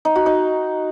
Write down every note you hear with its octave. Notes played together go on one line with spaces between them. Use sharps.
D#4
F#4
D#4